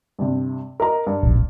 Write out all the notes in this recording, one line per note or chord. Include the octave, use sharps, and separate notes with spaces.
G2 C3
A#4 D#5 A#5
G2
D1 A#1